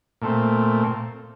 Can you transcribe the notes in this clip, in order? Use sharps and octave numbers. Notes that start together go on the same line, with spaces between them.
A#2 A3 C4